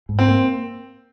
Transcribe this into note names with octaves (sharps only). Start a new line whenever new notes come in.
G#2
C4
A#3